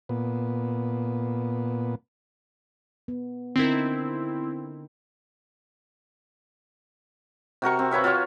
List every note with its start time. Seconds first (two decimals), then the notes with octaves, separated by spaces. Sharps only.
0.09 A#2 B3
3.08 B3
3.56 D3 C4 D#4 E4 A#4
7.62 C3 F#4 A#4 C#6
7.79 C4
7.91 B4 C#5 E5 F5
8.04 F4 F#4 C#5 F5